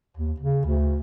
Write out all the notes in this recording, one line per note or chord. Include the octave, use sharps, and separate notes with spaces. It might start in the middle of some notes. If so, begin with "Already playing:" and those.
D#2
C#3
D2